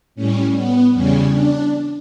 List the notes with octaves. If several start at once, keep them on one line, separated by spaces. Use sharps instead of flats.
A2 G3 C#4
B3
E2 C#3 G3 C#4
D4